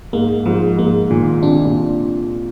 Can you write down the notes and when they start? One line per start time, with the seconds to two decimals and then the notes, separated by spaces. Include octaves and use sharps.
0.13 G#2 A#3
0.46 G#2 F3
0.77 G#2 A#3
1.10 A#2 D#3
1.43 C3 D4
1.65 A#2